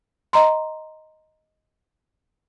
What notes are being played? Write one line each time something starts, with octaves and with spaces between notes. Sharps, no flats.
D#5 A#5 C6